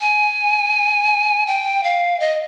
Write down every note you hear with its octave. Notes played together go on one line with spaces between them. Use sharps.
G#5
G5
F5
D#5